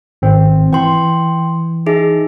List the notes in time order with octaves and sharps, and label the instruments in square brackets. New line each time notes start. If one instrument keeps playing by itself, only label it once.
[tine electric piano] G#1 C4
[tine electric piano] E3 [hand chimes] G5 C6
[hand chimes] D#4 G#4 E5